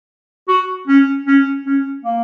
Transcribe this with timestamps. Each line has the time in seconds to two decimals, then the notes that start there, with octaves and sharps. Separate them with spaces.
0.48 F#4
0.88 C#4
1.27 C#4
1.66 C#4
2.05 A#3